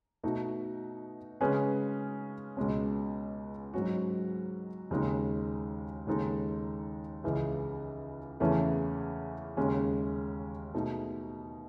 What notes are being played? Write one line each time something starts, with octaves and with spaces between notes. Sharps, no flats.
B2 A3 D#4 F#4
C#3 G#3 C#4 G#4 B4
C#2 B2 G#3 C#4
G#2 F#3 C#4 F#4
D#2 C#3 G#3 D#4
D#2 C#3 G#3 D#4 A4
C#2 C#3 E3
E2 C#3 E3 A3 C#4
D#2 C#3 G#3 C#4
B2 A3 D#4 G#4